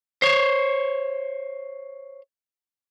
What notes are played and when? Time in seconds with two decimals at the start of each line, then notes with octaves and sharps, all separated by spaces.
0.22 C5 C#5